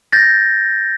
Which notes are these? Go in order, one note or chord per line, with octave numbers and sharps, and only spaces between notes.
G6 A6 A#6